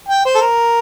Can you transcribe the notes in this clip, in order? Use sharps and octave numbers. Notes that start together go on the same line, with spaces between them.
G5
C5
A4
A#4